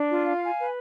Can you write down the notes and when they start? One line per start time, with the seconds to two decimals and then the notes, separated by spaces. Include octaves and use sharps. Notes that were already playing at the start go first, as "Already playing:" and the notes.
Already playing: D4
0.09 F4
0.25 F5
0.42 G#5
0.58 B4